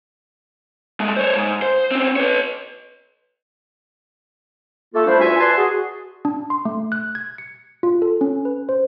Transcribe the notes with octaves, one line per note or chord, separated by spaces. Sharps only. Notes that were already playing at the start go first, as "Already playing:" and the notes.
G#3 A3
C5 C#5
G#2
C5
C4 C#4
B4 C#5
A3 A#3 F4 A4
F3 G3 A3 D4 E4 C5
E2 F4 F#4 E5 G#5
B4 D5 G#5 A5 C6
F#4 G#4
D4
C6
A3
F#6
G#6
C#7
F4
A4
C#4
B4
C5